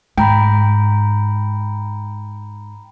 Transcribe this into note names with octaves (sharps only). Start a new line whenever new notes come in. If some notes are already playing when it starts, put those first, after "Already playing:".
G#2 G5 A#5 B5